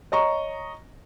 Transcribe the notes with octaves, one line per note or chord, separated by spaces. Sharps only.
C#5 D#5 A#5 C#6